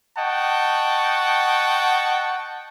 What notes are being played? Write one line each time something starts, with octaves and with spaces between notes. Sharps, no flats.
D#5 F#5 G5 A5 C#6